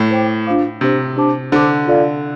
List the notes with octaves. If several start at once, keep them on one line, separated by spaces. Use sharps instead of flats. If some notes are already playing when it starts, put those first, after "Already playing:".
Already playing: A2
C5 G5 D6
D4 F4 C5 F5 D6
C3 D4 G4 C5
D4 G4 C5 A5 D6
D3 C5 A5 D6
F4 A4 D5 F5